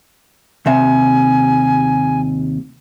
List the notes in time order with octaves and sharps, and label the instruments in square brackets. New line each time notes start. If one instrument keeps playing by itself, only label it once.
[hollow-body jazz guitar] D#2 C3 E5 [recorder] G#5